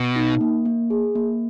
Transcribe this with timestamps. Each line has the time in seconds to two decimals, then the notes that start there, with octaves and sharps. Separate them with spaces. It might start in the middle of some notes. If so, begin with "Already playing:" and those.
Already playing: B2
0.16 D#4
0.41 A#3
0.65 A#3
0.90 G#4
1.15 A#3